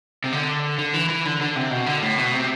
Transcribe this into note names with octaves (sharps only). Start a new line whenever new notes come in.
C3
D3
D3
E3
E3
D3
D3
C3
B2
D3
A2
B2
C3